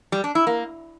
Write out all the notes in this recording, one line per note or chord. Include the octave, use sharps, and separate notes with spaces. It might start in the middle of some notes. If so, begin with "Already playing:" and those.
G3
D4
E4
A#3